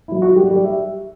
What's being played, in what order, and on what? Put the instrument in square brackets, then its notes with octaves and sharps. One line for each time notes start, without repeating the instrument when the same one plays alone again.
[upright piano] F#3 E4
F#4
F#3 G3 G4
G3 G4
E5